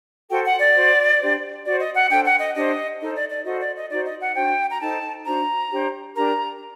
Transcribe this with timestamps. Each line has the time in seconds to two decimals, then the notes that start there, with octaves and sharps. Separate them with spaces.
0.30 F#4 A4 C5 G5
0.45 F#5
0.60 D5
0.75 F#4 C5
1.20 D4 G4 C5
1.65 F#4 C5 D5
1.80 D#5
1.95 F#5
2.10 D4 A4 C5 G5
2.25 F#5
2.40 D#5
2.56 D4 G4 C5 D#5
3.00 D#4 A4 C5 D#5
3.15 D5
3.31 D5
3.46 F#4 A4 C5 D#5
3.60 D5
3.75 D#5
3.90 D#4 F#4 C5 D5
4.05 D#5
4.21 F#5
4.35 D4 F#4 C5 G5
4.70 A#5
4.81 D#4 A4 C5 A5
5.25 D4 F#4 C5 A#5
5.71 D4 G4 C5
6.16 D4 G4 A#4 A#5